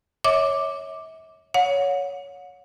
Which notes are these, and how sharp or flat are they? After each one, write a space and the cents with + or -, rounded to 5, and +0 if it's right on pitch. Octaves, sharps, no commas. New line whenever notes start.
C#5 +0 E5 -40 D6 +5
C#5 +15 F#5 -40